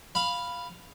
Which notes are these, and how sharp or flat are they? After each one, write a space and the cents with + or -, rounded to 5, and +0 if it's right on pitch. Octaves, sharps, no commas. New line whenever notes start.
F5 +0 B5 +0